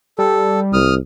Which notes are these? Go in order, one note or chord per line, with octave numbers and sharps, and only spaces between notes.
G3 A4
C2 D#6 F6